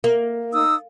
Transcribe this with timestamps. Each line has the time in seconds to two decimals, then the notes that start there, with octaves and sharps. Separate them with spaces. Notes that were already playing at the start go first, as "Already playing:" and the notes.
0.04 A#3
0.53 D#4 D#6 E6